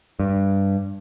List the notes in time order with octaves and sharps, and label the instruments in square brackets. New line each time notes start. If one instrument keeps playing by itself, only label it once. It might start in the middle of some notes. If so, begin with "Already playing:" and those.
[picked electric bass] G2